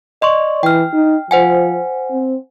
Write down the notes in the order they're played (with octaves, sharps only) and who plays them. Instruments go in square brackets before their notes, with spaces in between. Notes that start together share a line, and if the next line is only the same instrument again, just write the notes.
[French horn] D5 [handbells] D#5 C6 C#6
[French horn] E3 [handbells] G5 F6
[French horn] D#4
[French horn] F3 [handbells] C5 F#5 G#5
[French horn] C4